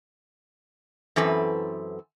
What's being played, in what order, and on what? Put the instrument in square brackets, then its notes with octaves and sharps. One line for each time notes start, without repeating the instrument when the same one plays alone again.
[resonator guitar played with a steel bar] F#2 E3 C4 A4 B4